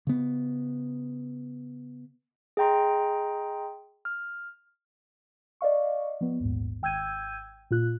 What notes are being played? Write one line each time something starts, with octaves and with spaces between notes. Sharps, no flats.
C#3 B3
G#4 D#5 G5 A#5 C6
F6
D5 D#5 F5 C#6
F3 B3
A#1 D#2 G#2
G#1 G5 E6 G6 G#6 D#7
A#2 F4 F#6